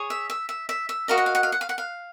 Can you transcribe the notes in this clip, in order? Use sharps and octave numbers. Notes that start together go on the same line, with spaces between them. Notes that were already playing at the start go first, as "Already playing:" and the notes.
Already playing: G#4 C#5
E5
E5
E5
E5
E5
F#4 A#4 D#5 F5
F#5
F5
F#5
F5
F#5
F5
F#5
F5